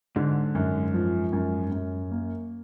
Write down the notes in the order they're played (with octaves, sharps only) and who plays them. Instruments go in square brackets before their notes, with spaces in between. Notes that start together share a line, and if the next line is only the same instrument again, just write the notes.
[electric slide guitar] G#2 [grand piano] D3
[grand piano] F#2
F3
F#2
F#2
A#3